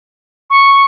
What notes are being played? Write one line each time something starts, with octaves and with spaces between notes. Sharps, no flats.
C#6